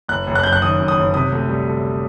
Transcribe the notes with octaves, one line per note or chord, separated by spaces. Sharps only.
F#1 F#6
F#1
F#6
F#2 G6
F#6
D#3 D#6
F#2
D#6
F#1
C3 D#6
D2
G3
D2